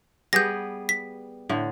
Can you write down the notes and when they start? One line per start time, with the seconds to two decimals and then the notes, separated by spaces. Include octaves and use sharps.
0.33 G3 B3 G#4 G6 A#6
0.89 B6
1.49 A2 D3